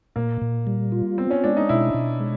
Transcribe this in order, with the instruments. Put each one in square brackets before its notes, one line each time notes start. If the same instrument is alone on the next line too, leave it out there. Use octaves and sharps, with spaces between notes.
[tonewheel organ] A#2 [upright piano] A#3
[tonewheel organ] A#2
G3
F4
[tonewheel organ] B3 [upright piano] C4
[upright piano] C#4
[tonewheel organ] G#3 [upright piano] D4
[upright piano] D#4
[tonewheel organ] B2 [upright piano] E4
[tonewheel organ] B2
G#3